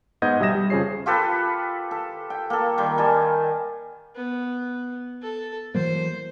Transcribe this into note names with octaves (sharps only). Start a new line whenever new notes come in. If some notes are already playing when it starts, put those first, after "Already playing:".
G#2 B3 D#5 F#5 G6 G#6
B1 G3 E5 D#6 A#6 E7
G3
F2 C#3 F3 G#4 C#5 C7
F4 G4 A4 B4
A4
G5
A#3 A4
D#3 G3
G3 G#5 A5
B3
A4
E3 F#3 A#3 C5